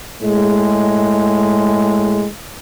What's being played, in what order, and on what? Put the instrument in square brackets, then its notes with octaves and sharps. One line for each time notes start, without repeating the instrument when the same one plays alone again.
[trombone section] A2 G#3